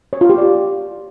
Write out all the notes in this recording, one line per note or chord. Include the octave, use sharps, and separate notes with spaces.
C#5
F4
G4
D5